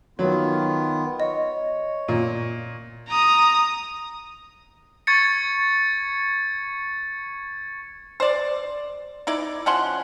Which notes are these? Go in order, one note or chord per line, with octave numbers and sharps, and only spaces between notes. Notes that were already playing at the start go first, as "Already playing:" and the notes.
D#3 F#3 B3 F4
C#5 D#5
A#2
A#5 D#6
C#6 G#6 A6 C#7
C5 D5
D#4 E4 D5
F3 C#4 F#5 C6